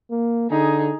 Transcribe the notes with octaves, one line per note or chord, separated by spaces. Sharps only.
A#3
D3 D#4 G#4